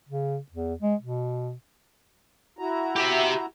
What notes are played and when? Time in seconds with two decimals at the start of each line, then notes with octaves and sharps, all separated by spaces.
0.09 C#3
0.51 E2
0.82 G#3
1.01 B2
2.59 E4 F#4 A#5
2.96 G4 E5